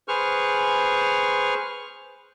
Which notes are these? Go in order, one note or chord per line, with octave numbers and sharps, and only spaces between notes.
G#4 B4 C5 C#6 F6